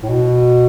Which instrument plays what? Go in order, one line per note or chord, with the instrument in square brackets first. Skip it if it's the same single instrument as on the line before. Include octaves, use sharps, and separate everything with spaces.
[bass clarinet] A2
B2